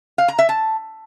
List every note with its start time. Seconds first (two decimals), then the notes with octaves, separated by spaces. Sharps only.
0.18 F5
0.28 A#5
0.39 E5
0.49 A5